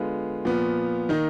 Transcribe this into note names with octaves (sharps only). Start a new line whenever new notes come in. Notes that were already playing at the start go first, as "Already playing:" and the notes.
Already playing: D3 G#3 B3 F4
A#2 F3 B3
D#3 A#3 D#4